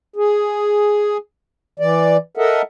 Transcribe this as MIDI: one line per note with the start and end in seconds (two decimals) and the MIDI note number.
0.16 1.17 68
1.80 2.17 52
1.80 2.17 74
2.37 2.62 69
2.37 2.62 70
2.37 2.62 75
2.37 2.62 76
2.37 2.62 78